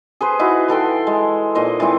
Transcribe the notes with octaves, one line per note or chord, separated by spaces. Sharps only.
G#4 B4 C5
D#4 E4 F#4 B4
E3 A4 G5 C6
G#3
A#2 D#4 C5 D#5
E3 G#3 C4 E4